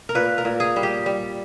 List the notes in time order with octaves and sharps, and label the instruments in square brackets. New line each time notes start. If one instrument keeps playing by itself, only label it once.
[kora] A#4
A#2 B4
A#4
A#2
G#4
G3
G4
G3